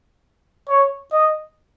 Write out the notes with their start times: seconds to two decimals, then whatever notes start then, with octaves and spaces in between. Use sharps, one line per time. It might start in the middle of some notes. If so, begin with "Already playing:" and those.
0.69 C#5
1.13 D#5